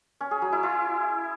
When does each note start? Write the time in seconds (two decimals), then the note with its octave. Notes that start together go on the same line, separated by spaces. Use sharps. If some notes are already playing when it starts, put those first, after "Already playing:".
0.21 C#4
0.31 G#4
0.42 F#3
0.52 E4
0.63 E4